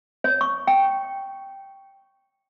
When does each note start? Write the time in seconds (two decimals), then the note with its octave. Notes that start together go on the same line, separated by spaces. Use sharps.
0.24 C#5
0.41 C#6
0.67 G5